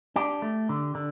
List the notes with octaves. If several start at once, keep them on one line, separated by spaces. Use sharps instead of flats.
D4 G4
A3
D3
D3